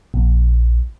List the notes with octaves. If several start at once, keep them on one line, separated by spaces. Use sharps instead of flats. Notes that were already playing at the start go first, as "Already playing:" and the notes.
A#1